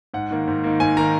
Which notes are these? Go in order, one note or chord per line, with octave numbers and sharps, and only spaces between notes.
G#2 F#5
D#3 A#3
G#2
D#3 A#3
G#2 G#5
D#3 A#3 A#5